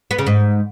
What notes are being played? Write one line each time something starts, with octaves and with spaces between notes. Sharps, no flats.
B3
C#3
G#2